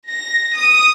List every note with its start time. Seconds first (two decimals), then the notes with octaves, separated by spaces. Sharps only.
0.11 A#6
0.58 D#6